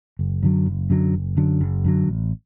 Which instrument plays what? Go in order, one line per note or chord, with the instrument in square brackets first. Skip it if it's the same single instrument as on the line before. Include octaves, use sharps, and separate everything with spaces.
[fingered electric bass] F#1
F#2 D3 F#3
F#1
F#2 D3 F#3
F#1
F#2 D3 F#3
F#1
F#2 D3 F#3
A1